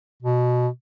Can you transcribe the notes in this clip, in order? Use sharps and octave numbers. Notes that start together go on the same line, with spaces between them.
B2